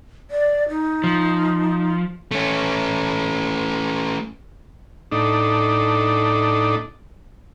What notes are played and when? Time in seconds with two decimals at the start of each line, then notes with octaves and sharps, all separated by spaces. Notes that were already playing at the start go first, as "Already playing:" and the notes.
0.31 D5
0.69 D#4
1.04 F3
2.31 A3 C#4
5.12 A2 D4 D#4